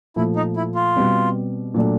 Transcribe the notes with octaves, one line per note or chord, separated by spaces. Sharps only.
A#2 F3 A3 E4
D#4
E4
F4
B2 G3 C4
A#2 F#3 A3 D4